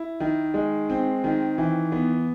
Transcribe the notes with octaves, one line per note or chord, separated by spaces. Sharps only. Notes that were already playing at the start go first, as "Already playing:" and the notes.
Already playing: E4
D#3
G#3
C4
D#3
E3
B3